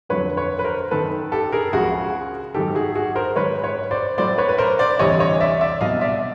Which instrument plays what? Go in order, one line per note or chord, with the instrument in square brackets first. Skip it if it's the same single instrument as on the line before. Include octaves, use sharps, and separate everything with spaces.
[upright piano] F2 D3 F#3 B4 C#5
B4 C#5
B4
A#4 C5
F#2 D#3 F#3 A4 B4
G4 A4
G#4 A#4
C#2 C#3 F3 F#4 G#4
G#2 D#3 F#3 G4 A4
F#4 G#4
F#4 G#4
A#4 C5
G#2 D#3 F#3 B4 C#5
B4 C#5
C5 D5
A2 F#3 C5 D5
B4 C#5
B4
A#4 C5
C5 D5
D2 C3 E3 G3 C#5 D#5
C#5 D#5
D5 E5
D5 E5
C2 B2 F#3 D#5 F5
D5 E5